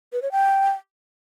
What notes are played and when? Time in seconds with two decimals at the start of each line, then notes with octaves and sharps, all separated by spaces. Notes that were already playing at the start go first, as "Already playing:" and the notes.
0.13 B4
0.22 C#5
0.32 G5